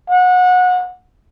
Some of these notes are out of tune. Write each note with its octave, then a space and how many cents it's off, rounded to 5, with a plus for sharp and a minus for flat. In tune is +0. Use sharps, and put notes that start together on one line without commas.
F#5 -25